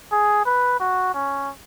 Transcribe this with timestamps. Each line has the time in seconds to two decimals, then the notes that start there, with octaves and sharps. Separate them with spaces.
0.12 G#4
0.46 B4
0.79 F#4
1.14 C#4